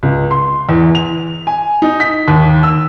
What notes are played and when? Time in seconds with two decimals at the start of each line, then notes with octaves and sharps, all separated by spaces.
0.03 C#2
0.31 C6
0.69 E2
0.95 F7
1.47 G#5
1.82 D#4
2.00 B6
2.28 D#2
2.63 E6